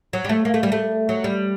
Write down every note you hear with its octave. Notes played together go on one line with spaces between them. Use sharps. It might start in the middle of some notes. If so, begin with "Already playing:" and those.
F#3
G3
A3
A#3
A3
G3
A3
F#3
G3